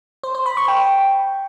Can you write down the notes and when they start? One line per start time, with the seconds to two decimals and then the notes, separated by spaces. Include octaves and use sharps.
0.23 C5
0.35 C5
0.46 B5
0.57 C#6
0.68 G5